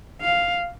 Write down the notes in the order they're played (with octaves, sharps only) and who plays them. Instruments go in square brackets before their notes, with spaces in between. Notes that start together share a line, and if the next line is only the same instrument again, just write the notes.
[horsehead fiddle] F5